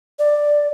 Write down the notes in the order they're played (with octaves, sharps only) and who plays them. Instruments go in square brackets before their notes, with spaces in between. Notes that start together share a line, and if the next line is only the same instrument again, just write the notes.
[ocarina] D5